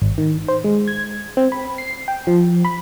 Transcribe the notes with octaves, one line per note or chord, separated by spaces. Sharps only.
G#1
D#3
C5
G#3
G#6
C4
B5
C7
G5
F3
B5